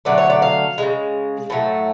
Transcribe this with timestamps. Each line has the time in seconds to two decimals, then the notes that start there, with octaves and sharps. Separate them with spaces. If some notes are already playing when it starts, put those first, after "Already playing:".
0.05 D3 F#3 A3 D5
0.18 C#5
0.30 D5
0.42 F5
0.78 C#3 G#3
1.50 A2 F#3 A3